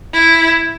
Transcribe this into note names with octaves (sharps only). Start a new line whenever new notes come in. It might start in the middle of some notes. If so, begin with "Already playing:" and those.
E4